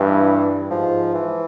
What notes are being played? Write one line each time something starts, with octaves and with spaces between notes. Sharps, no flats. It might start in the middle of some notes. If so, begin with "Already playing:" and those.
Already playing: G2 E3
G#2 F3
E3